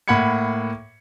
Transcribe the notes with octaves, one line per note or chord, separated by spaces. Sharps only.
A2 A#3 F#5 B5 G#6 C#7